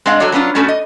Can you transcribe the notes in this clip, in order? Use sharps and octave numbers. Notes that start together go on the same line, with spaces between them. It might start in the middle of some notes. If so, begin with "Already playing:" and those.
G#3 C4 D4 D#5 F5 F#5
F#3 F#4 A4 C#5 D5
F#3 B3 C#4 D4 F4
B2 A3 C#4 F#4 A4 D5
D#5